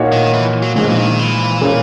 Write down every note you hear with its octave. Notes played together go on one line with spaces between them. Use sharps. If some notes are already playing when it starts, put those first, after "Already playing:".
Already playing: A#2 A#3 D#4 F#4 C#5
D#3
E3
F#3
A#1 A#2 F#3 G#3
E3
D#3
E3
A#2 A#3 C#4